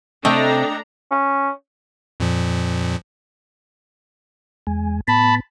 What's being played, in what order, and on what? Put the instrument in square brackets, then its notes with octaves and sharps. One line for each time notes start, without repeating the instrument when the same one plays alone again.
[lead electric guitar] C3 [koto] A3 [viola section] D4 A4 A#5 [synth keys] D#5 G5
[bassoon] C#4
[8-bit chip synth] F2 A#2 F3
[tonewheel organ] E2 G#3 G#5
[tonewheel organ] A2 B3 [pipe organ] A5 B5